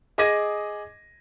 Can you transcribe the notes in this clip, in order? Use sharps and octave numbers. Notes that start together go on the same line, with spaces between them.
G#4 D#5 D6 G#6 A#6 D#7